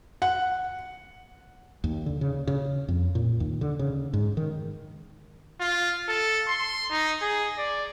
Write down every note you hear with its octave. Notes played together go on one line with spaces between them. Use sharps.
F#5
D#2
D3
C#3
C#3
F2
A#2
D#2
D3
C#3
G#2
D#3
F4
A4
C6
D#4
G#4
D5